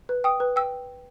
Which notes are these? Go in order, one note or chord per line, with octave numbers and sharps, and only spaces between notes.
B4
G5 D#6
B4
G5 E6